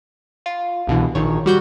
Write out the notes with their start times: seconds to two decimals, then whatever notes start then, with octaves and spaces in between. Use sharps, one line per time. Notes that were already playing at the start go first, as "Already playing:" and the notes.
0.46 F4
0.87 C2 B2 D3 E3
1.15 A#1 D#3 C#5
1.46 G3 F#4 G6